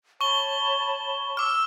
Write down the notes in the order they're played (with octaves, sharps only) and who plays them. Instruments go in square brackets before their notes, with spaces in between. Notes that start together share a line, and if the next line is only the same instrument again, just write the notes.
[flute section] C#5 A5 B5 [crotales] C#6 G7
[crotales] D6 F6 [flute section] E6